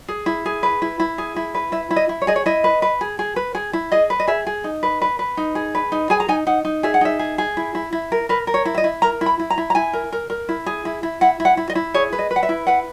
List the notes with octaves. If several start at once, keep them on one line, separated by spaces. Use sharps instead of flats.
G#4
E4
G#4
B4
E4
E4
G#4
E4
B4
E4 E5
E4
D#5
E4
C#5
G#4 D#5
C#5
E4 D#5
B4
B4
G#4
G#4
B4
G#4
E4
G#4 D#5
B4
D#5
G#4 E5
G#4
D#4
B4
B4
B4
D#4
G#4
B4
D#4
G#4 G#5
A#5
D#4 G#5
D#4 F#5
D#4
G#4 E5
F#5
D#4 E5
G#4
G#4
E4
E4
E4
A#4
A#4 B4
A#4
C#5
E4
E5
D#5
E4
A#4 A#5
E4
B5
E4
A#5
E4
A#5
E4 G#5
A#4
A#4
A#4
E4
G#4
E4
E4
E4 F#5
E4
F#5
E4
D#5
E4
G#4 C#5
B4
D#5
B4
F#5
E5
E4
B4 F#5